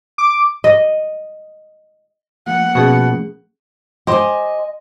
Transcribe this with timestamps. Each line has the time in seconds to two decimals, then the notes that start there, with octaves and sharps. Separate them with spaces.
0.18 D6
0.64 D#5
2.47 F3 A3 A#3 F#5
2.75 B2 C#4 G#4
4.07 G4 C5 D#5 G#5